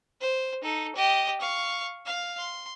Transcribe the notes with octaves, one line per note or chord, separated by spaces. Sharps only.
C5
D#4 A4
G4 D#5
F5 C#6
F5
C6